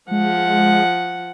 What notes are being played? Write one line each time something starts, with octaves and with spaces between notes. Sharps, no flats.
F3 G#3 F#5